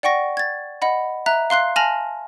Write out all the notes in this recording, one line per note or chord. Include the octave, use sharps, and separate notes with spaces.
D5 F#5 G5 C#6 A#6
G#6 A6
D#5 F#5 B5
E5 A#5 F#6
F5 C6 F#6 C7
G#5 A5 F6 A#6 F7 F#7